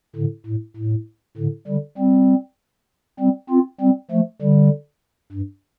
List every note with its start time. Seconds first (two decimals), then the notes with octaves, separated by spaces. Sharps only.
0.16 A2 D3
0.46 A2
0.77 A2
1.37 A2 D3
1.68 D3 G3
1.98 G3 C4
3.20 G3 C4
3.50 C4 F4
3.81 G3 C4
4.11 F3 A3
4.42 D3 G3
5.33 G2